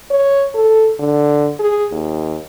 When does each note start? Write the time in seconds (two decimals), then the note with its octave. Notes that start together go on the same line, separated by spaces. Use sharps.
0.11 C#5
0.55 A4
0.99 D3
1.59 G#4
1.92 D#2